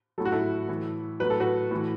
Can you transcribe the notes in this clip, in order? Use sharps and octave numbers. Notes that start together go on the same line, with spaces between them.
A2 F#3 A4
F#4
E4 A4
A2 E3
A2 F#3 B4
A4
F#4 B4
A2 E3